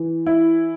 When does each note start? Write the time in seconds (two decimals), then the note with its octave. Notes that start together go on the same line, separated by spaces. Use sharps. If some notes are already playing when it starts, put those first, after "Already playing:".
Already playing: E3
0.27 E4